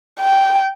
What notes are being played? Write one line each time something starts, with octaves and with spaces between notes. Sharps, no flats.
G5